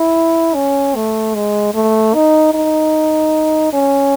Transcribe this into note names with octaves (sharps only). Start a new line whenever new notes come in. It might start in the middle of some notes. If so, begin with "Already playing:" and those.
Already playing: E4
C#4
A3
G#3
A3
D#4
D#4
C#4